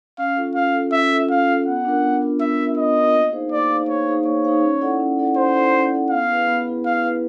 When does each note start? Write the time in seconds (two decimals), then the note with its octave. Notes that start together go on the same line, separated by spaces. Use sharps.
0.18 C#4 F5
0.36 F4 A4
0.55 C#4 F5
0.74 F4 A4
0.92 C#4 E5
1.11 F4 A4
1.29 C#4 F5
1.47 F4 A4
1.66 B3 F#5
1.85 D4 F4 A#4
2.03 B3
2.21 D4 F4 A#4
2.40 B3 E5
2.59 D4 F4 A#4
2.77 B3 D#5
2.96 D4 F4 A#4
3.15 A#3
3.32 D#4 G#4 C5 F5
3.51 A#3 D5
3.69 D#4 G#4 C5 F5
3.88 A#3 C#5
4.07 D#4 G#4 C5 F5
4.25 A#3 C#5
4.45 D#4 G#4 C5 F5
4.63 C#4
4.81 E4 A4 D5 F#5
5.00 C#4
5.19 E4 A4 D5 F#5
5.37 C#4 C5
5.55 E4 A4 D5 F#5
5.73 C#4
5.92 E4 A4 D5 F#5
6.10 B3 F5
6.29 E4 G#4 B4
6.47 B3
6.66 E4 G#4 B4
6.85 B3 F5
7.03 E4 G#4 B4